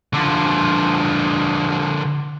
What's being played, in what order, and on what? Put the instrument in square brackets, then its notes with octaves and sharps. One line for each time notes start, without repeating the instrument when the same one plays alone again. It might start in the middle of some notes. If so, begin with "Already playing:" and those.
[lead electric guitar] D3 F3